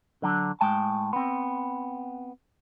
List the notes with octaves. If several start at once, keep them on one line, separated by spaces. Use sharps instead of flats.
D3 F#3 D4
A2 G#3 G5 A5
B3 C4